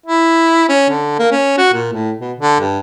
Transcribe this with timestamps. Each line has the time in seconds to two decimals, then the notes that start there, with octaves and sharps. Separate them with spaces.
0.06 E4
0.69 C#4
0.90 D3
1.19 A#3
1.32 C#4
1.58 F#4
1.73 A#2
1.93 A2
2.20 B2
2.38 D3
2.60 G2